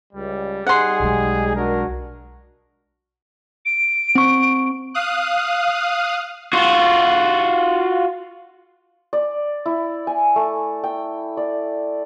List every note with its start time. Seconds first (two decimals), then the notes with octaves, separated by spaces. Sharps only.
0.13 C#2 G3
0.67 G3 D#4 G#4 F#5 C6
1.00 B1 G#3
1.55 D4 F#4 A#4
3.65 D7
4.15 C4 C#6
4.94 F5 D#6 F#6
6.53 F4 F#4
9.13 D5
9.66 E4
10.07 G#5
10.36 A3
10.84 G5
11.37 D5